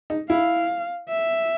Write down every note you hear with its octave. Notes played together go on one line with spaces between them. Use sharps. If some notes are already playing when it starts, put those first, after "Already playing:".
D#4
E4 F5
E5